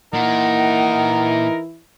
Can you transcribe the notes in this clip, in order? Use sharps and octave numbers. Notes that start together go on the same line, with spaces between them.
A#2 E3 D#4 E4 A#4 F#5